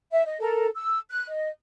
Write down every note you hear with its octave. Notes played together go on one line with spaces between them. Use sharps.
E5
D#5
A4 A#4 A#5
E6
F#6
D#5